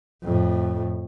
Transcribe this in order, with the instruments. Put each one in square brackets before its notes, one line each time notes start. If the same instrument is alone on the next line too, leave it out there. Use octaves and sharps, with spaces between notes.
[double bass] F2 A2